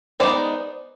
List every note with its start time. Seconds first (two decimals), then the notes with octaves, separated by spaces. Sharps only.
0.20 G#3 B3 D#4 C5 D5